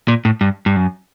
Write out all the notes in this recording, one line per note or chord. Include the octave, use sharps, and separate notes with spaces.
A#2
A2
G2
G2
F#2